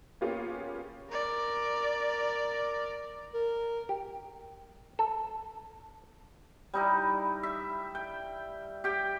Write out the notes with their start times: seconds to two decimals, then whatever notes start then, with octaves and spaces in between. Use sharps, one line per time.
0.21 A#3 B3 C#4 F4 G4 G#4
1.10 A#4 D5
3.34 A#4
3.89 G4
4.99 A4
6.74 G3 D#4 E4
7.43 E5
7.95 G5
8.84 G4 G5